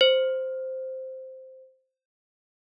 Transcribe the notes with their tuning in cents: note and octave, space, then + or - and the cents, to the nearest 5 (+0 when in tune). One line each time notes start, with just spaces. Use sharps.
C5 -5